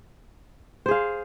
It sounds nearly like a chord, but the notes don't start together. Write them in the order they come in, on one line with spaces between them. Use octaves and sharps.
C5 G#4 F5